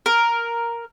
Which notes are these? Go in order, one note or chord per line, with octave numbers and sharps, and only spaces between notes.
A#4